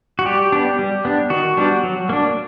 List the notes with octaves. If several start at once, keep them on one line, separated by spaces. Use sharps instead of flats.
F#4
G3 G4
B3 D4
G3
B3 D4
D#3 F#4
G3 B3 D4
F#3
A#3 D4